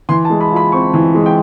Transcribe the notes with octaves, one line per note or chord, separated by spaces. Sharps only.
E3 C6
A5
G#3
B5
F4 B5
C4 C#6
E3
G#3
G5